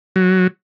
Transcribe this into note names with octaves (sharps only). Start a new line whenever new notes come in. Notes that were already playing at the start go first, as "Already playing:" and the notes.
F#3